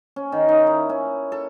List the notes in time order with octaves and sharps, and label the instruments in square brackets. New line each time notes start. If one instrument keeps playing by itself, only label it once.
[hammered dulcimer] C#4
D#3
D#4
E4
C#4
A4